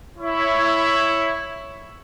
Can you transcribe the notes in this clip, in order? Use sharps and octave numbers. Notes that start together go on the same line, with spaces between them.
E4 C#5